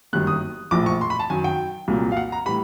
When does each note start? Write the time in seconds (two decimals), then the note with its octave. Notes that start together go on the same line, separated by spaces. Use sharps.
0.13 G1 F#2 D#3 G3 A#3 F#6
0.27 D#6
0.71 A#1 A2 F3 D6
0.86 C#6
1.01 C6
1.10 B5
1.19 A5
1.30 F#2 D#3 F#3 G#5
1.44 G5
1.88 C2 A#2 F#3 A#3
2.12 F5
2.17 F#5
2.32 A#5
2.46 A2 E3 G3 B5